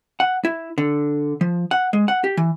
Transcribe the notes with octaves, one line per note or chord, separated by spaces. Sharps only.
F#5
E4
D3
F3
F#5
G#3
F#5
G4
E3